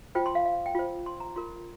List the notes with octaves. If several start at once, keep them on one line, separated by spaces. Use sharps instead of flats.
F4 C5 G5
C6
F5
F5
G5
F4 C5
C6
A#5
F4 A#4 C6